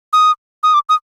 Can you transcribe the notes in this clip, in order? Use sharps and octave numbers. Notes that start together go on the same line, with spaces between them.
D#6
D#6
D6
D#6